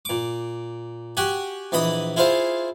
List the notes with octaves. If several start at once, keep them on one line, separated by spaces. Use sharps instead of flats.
A#2 D6
F#4 G4 F#5 G#5
A#1 E3 D#5 B5 D#6
E4 F4 G#4 C5 F5